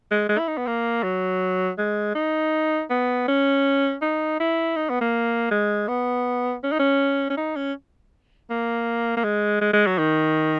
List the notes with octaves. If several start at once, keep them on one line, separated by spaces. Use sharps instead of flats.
G#3
G#3
E4
D#4
B3
A#3
F#3
G#3
D#4
B3
C#4
D#4
E4
D#4
B3
A#3
G#3
B3
C#4
D#4
C#4
C#4
D#4
C#4
A#3
A#3
G#3
G#3
G#3
F#3
D#3